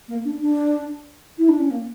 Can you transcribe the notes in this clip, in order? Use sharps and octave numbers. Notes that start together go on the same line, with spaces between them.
A#3
D4
D4
E4
D4
C#4
A#3